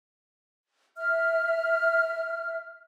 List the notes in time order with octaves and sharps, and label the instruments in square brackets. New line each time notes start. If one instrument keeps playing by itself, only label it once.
[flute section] E5 F6